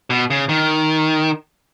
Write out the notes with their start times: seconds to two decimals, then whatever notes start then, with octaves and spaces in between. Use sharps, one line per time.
0.10 B2
0.30 C#3
0.49 D#3